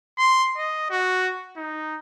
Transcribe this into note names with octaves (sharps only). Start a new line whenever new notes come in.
C6
D#5
F#4
D#4